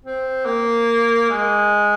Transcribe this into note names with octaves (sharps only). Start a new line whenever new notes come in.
C4
A#3
G#3